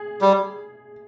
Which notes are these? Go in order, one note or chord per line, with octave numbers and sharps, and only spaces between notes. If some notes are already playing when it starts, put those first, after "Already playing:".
Already playing: G#4
G3